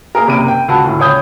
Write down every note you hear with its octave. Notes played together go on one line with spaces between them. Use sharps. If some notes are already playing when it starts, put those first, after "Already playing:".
A#3 G#4 A#4
F#1 C3 A#4 D7 D#7
G5
C#2 F#4 A5
D2 A2
C#2 C#5 D#6 G6